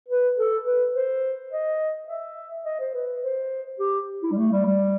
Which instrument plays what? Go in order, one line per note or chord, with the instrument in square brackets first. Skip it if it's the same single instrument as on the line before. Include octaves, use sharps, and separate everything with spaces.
[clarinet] B4
A4
B4
C5
D#5
E5
D#5
C5
B4
C5
G4
E4
G3
A3
G3
G3